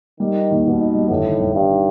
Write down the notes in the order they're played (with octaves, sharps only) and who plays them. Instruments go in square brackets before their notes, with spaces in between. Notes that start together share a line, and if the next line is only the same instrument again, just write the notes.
[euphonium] D#3 [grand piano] G3
[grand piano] D#4
D#2
[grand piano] D#2 [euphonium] B2
[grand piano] D#4
G3
[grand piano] G1 [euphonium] A2
[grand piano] D#3
G1
[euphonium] G2 [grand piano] D#3
[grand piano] D#3